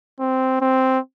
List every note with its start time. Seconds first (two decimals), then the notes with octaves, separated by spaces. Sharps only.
0.20 C4
0.61 C4